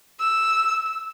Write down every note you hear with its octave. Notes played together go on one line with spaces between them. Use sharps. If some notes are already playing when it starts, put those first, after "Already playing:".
E6